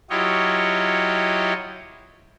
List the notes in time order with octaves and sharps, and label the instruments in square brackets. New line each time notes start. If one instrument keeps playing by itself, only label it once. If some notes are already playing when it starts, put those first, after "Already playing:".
[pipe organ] F#3 E4 F4 G4 C#5 D#5